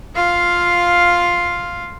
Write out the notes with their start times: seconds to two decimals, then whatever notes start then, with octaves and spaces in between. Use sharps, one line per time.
0.16 F4 F5